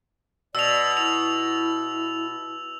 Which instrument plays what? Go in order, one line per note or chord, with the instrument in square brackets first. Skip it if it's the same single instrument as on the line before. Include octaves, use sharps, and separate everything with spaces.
[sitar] B2 [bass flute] D5 [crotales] E6 F7
[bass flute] E4 [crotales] F7